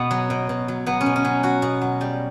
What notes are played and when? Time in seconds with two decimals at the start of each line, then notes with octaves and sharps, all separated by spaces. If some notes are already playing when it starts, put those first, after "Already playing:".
Already playing: B2 B3
0.11 F#3
0.30 B2
0.49 B2
0.68 F#3
0.86 F#3 B3
1.01 C#4
1.06 B2
1.16 C#4
1.25 F#3
1.43 F#3 F#4
1.62 B2
1.82 F#3
2.01 G3